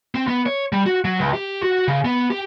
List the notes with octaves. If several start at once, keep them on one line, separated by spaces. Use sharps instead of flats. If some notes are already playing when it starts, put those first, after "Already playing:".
C4
B3
C#5
G3
F#4
F#3
C#2
G4
F#4
C#3
B3
G4